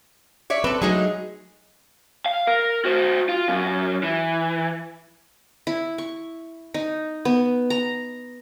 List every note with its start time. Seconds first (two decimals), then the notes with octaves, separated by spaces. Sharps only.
0.50 C#5 D5 E5
0.64 C4 A4 B4
0.82 F#3 G#3 A3 D#4 G#4
2.26 F5
2.47 A#4
2.85 F#4 C5
3.29 F4
3.48 F#2
4.03 E3
5.67 E4
5.98 C#6
6.74 D#4
7.25 B3
7.70 A#5